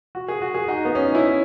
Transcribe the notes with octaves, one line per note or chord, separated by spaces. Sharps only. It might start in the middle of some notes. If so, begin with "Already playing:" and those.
F#4
G#4
F#4
G#4
D#4 F#4
B3
C#4
D#4
C#4 E4